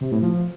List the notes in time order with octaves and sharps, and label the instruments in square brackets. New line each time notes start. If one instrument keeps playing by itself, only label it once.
[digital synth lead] C3
A2
F3